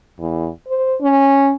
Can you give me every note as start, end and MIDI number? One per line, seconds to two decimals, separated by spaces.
0.19 0.49 40
0.67 0.95 72
1.02 1.54 61